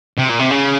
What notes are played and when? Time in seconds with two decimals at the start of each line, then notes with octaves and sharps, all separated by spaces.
0.18 C3
0.29 A#2
0.39 C3
0.51 C#3